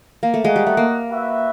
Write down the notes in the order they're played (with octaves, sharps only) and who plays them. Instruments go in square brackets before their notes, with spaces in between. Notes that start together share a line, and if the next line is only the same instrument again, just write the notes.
[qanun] A#3
A3
[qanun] G#3 [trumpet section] F#4 A#4 D#5 F#5
[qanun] G3
A3
A#3
[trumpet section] F#4 B4 E5